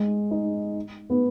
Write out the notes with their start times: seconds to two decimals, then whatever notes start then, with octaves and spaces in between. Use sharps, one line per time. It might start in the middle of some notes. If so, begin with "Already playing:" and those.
Already playing: G#3
0.31 D#4
1.10 B3